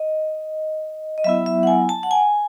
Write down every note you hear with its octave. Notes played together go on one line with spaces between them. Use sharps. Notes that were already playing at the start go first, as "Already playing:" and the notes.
Already playing: D#5
D#5
F#3 B3 E4 E5
E5
F#5
G#5
A5
F#5
G#5